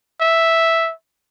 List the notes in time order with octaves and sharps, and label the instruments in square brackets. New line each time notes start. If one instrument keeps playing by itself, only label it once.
[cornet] E5